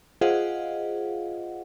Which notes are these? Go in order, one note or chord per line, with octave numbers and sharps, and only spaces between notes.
F4 G#4 C5 D#5 F5 F#5